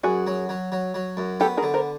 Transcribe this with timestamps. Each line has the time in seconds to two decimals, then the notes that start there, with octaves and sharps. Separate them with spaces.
0.04 F#2 F#4 G#4
0.27 F#3
0.49 F#3
0.72 F#3
0.94 F#3
1.17 F#2
1.40 B3 G4 A4
1.57 G#4 A#4
1.63 D3
1.74 A#4 C5